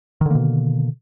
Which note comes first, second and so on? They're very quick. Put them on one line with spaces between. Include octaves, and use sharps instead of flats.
D#3 D3 A#3 B2